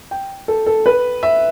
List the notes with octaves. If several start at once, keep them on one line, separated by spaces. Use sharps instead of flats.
G5
A4
A4
B4
E5